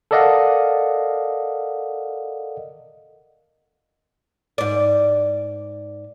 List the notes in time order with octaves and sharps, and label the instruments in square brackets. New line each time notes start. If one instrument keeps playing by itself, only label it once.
[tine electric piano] A4 A#4 D5 D#5 F5 F#5
[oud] G#2 D5